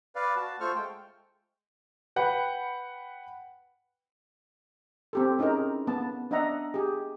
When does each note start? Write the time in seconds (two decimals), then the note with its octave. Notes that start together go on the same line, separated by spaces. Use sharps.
0.15 B4 D5 F5
0.36 F#4 A5
0.60 A3 F4 A4 C5 C#6 F6
0.75 G#3 G5
2.16 B4 F#5 G5 B5
5.13 C4 G4 A4
5.39 C#4 D#4 E4 G#4 A#4
5.87 B3 A5
6.31 D4 D#5 E5 F#5 A#5
6.74 G4 G#4